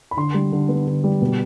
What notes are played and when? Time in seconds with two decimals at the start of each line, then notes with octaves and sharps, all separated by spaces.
0.11 B5
0.17 D3 C6
0.34 G3
0.52 D3
0.69 B3
0.87 D3
1.04 G3
1.22 B2